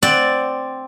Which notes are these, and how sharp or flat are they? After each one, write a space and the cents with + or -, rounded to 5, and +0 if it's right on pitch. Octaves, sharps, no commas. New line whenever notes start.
C4 +0 D5 +0 F#5 +0